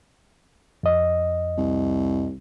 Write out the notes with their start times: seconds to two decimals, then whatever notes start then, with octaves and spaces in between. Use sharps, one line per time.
0.83 F2 D#5
1.58 C2